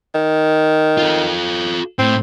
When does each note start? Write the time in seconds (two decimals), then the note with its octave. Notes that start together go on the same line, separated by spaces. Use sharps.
0.15 D#3
0.98 F4 A4
1.99 A2 C4